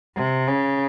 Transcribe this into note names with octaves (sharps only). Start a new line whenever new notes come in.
C3
C#3